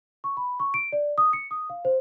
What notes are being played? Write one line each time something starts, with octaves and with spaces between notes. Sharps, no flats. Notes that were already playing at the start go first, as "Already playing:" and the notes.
C#6
B5
C#6
D7
D5
D#6
C#7
D#6
F5
C5